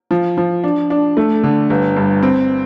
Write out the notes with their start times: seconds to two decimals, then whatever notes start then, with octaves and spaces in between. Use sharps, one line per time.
0.11 F3
0.37 F3
0.64 D4
0.90 D4
1.17 A3
1.43 D3
1.70 G1
1.96 G2
2.23 C4